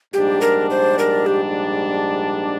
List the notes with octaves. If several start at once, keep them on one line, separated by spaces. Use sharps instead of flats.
A#1 G#2 G3 D4 G4
A#4
C5
A#4
G4